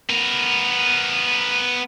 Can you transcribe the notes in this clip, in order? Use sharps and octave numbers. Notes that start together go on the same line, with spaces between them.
B3 A#4